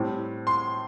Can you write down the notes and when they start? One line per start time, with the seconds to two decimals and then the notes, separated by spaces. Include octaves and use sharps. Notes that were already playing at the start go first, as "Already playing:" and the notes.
Already playing: A2 G3 C4
0.47 C6